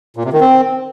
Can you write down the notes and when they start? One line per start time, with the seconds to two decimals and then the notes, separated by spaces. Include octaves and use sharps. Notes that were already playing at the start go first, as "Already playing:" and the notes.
0.16 A#2
0.25 C3
0.33 D#3
0.41 C4